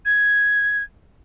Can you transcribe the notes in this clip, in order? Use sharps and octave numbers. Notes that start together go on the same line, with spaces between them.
G#6